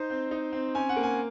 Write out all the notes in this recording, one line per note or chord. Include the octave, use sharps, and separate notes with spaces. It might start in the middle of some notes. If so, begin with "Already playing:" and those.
Already playing: D#4 C5
C4
D#4
C4
C#4 G#5
F#5
A#3
G#5